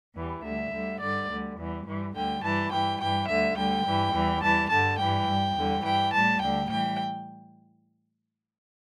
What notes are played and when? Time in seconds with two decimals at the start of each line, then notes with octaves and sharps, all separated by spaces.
0.15 E2 E3 G3
0.43 D2 D3 G3 E5
0.72 D2 D3 G3
1.00 G2 D3 G3 D5
1.29 D2 D3 G3
1.57 E2 E3 G3
1.86 G2 E3 G3
2.14 D2 D3 G3 G5
2.43 G2 E3 G3 A5
2.71 G2 E3 G3 G5
3.00 G2 E3 G3 G5
3.28 D2 D3 G3 E5
3.56 D2 D3 G3 G5
3.85 G2 E3 G3
4.13 E2 E3 G3
4.42 E2 E3 G3 A5
4.70 G2 D3 G3 A5
4.99 G2 E3 G3 G5
5.27 G2 G3
5.56 E2 D3 G3
5.84 G2 E3 G3 G5
6.13 A2 G3 A5
6.41 D2 D3 G3 G5
6.69 A2 E3 G3 G5